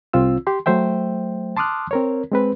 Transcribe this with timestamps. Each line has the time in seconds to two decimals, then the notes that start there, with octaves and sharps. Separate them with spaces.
0.13 C2 C4 F4 E6
0.47 G4 C6
0.66 F#3 A3 C5 E5 G5
1.57 A5 C6 D6 D#6 F6 F#6
1.91 C4 A#4 C#5
2.32 G#3 C4 B4